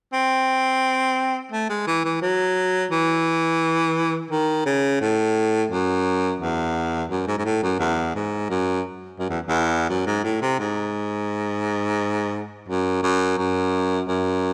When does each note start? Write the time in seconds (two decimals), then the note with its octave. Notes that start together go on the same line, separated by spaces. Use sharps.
0.13 C4
1.52 A3
1.69 G#3
1.87 E3
2.05 E3
2.22 F#3
2.91 E3
4.31 D#3
4.66 C#3
5.01 A2
5.71 F#2
6.40 E2
7.10 F#2
7.27 G#2
7.38 G#2
7.45 A2
7.63 F#2
7.79 E2
8.15 G#2
8.50 F#2
9.19 F#2
9.29 E2
9.49 E2
9.89 F#2
10.06 G#2
10.24 A2
10.42 C3
10.59 G#2
12.68 F#2
13.03 F#2
13.38 F#2
14.08 F#2